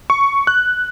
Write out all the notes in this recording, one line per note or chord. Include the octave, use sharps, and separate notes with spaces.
C#6
F#6